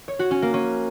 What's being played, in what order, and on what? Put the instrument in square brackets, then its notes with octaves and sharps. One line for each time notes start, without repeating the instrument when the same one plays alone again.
[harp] C#5
F#4
C#4
A#3
C#4